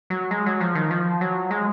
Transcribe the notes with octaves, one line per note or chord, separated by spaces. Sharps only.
F#3
G#3
F#3
F3
D#3
F3
F#3
G#3